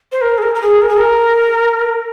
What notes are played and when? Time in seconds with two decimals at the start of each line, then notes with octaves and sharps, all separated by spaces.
0.12 C5
0.21 A#4
0.38 G#4
0.42 A#4
0.55 A#4
0.62 G#4
0.82 A#4
0.89 G#4
0.97 A#4